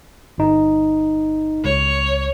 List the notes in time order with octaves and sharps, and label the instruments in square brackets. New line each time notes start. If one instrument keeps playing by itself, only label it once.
[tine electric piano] G1 D#4
[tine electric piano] C#2 [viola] C#5